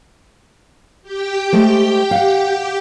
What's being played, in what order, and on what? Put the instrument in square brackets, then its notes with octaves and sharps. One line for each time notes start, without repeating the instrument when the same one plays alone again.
[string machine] G4 G5
[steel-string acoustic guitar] G#3 A3 C5
F5 F#5